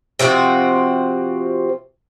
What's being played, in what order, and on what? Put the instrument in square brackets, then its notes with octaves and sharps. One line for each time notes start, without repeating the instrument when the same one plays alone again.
[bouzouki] C3 F3 C4 F#4